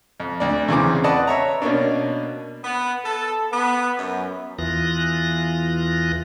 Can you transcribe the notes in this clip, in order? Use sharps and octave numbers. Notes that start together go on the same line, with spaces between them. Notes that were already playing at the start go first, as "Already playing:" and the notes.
F2
D2 D5
E2 C#3 E3 C4 D6
B4 D5 D#5 F#5 A5
C#5 E5 A#5
B2 A#3 C#4 D4
B3
A4
B3
F#2
E2 E3 F4 D#6 F#6 A#6